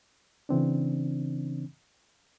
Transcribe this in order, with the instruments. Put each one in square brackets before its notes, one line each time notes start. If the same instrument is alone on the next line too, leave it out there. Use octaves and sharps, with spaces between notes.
[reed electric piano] C#3 E3 C4 D4